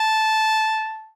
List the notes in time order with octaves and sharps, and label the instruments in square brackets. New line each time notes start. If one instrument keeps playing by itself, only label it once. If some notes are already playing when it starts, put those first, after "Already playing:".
Already playing: [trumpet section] A5